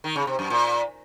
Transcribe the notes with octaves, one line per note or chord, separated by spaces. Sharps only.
D#3
C#3
C3
F#2
A#2